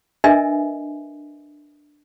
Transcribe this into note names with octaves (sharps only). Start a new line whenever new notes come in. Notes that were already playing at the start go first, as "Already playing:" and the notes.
D4 A#4 B4 D#5 E5 G#5